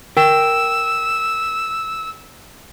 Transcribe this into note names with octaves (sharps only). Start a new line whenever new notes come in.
A#4 G5 E6